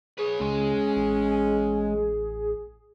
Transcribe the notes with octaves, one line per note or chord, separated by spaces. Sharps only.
G#4 B4 C#5
C#2 G#3 C#4
A1